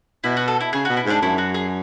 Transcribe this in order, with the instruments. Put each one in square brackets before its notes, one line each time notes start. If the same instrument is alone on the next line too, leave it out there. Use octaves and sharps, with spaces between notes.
[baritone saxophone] B2 [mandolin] E4
[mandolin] F#4
A4
E4
[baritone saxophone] C#3 [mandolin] G#4
[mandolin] F#4
[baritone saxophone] B2
[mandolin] E4
[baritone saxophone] G#2 [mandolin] D4
[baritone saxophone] F#2 [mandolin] E4
[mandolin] F#4
G#4